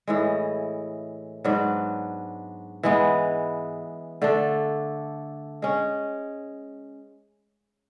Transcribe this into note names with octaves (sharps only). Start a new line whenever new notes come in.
A2 E3 G#3
G#2 F#3 B3 D4
E3 G#3 B3
D3 A3 D4
G#3 C#4